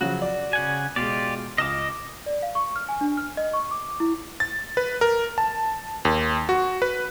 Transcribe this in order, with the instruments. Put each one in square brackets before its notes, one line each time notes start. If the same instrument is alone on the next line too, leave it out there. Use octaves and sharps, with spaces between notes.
[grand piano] C#3 F3 F#3 [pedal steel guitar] F#4
[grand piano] D5
[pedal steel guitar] C#3 F#5 G#5
[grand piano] B2 G#3 [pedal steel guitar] F4 G4 D5
[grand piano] C#2 F6 E7 [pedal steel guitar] D#5 D6
[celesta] D5
F5
C#6
F6
G#5
D4
F6
D#5
C#6
D6
E4
[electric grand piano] A6
B4
A#4
A5
D#2
F#4
B4